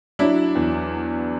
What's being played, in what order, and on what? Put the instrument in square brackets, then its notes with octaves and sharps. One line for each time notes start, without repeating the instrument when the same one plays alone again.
[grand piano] F#3 D4 E4
E2